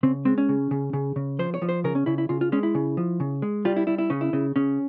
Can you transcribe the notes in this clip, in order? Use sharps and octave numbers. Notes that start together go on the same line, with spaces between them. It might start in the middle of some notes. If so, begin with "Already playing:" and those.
C#3 C4
G#3 C4
C#4
C#3
C#3
C#3
C#3
F3 C5
C#5
F3
C5
C#3 A#4
C#4
C#3 E4
E4
C#3 F4
F4
G#3 C#4
E4
C#3
F3
C#3
G#3
G3 F4
E4
G3 E4
E4
C#3 C#4
E4
C#3
C#3 C#4